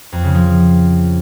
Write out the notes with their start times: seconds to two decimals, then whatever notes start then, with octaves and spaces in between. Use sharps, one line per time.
0.12 F2
0.24 C#3
0.35 F3